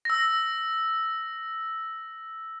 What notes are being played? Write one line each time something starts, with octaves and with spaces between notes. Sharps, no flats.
E6 A#6